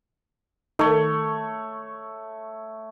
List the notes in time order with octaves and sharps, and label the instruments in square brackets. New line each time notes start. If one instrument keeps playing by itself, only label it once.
[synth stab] D#3 [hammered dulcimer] A3 C#5